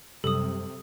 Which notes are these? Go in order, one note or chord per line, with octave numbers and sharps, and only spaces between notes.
F#2 C3 G3 A4 D#6